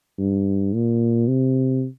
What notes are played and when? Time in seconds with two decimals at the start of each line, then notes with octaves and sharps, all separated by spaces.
0.19 G2
0.73 A#2
1.28 C3